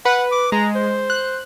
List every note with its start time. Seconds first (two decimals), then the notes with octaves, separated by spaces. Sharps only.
0.05 B4 F#5
0.32 D6
0.52 G#3 A#5
0.75 C5
1.10 F#6